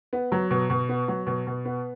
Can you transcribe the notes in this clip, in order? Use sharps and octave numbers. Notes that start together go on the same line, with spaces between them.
B3
F#3
B2
B2
B3
F#3
B2
B2
B3